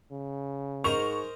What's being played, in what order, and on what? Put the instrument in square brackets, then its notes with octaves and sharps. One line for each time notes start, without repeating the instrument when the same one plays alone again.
[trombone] C#3
[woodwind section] G#2 [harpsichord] A#4 C5 D#5 [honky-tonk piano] C#6 F7